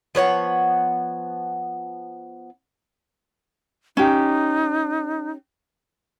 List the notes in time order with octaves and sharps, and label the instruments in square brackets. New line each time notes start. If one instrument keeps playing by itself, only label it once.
[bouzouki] F3 B3 C#5 F#5
[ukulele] C#4 G4 [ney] D#4